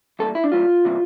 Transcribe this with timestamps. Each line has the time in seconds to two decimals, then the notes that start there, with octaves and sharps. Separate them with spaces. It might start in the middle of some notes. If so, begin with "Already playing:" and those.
0.19 E3 G3 A#3 A4
0.35 E4
0.44 D4
0.52 E3 G3 A#3 F4
0.85 C3 E3 G3 A#3